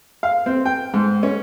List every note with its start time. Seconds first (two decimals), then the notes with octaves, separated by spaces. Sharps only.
0.23 F5
0.46 C4
0.66 G5
0.94 G#2
1.23 C#4